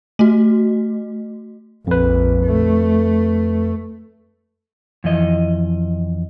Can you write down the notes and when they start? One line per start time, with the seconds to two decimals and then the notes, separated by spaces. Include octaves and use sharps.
0.19 A3 F#4
1.87 A#1 F2 B4
2.46 A3
5.04 F2 E3 D#5